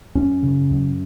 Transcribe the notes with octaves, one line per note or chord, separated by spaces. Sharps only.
F#2 C#4
C#3
F#2